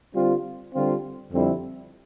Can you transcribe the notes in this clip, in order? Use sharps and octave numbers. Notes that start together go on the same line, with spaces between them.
D3 G3 C4 F4
D3 G3 C4 F4
F2 D3 G3 C4 E4